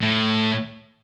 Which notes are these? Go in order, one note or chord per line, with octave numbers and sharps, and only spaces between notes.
A2